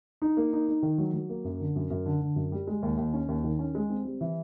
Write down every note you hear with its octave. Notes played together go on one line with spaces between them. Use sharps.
D#4
A#3
D#4
D#4
D#3
F#3
F#3
A#3
F#2
D3
F#2
F#2
D3
D3
F#2
G3
G#3
D#2
D#2
C#4
D#2
D#3
C#4
G#3
C4
G3
E3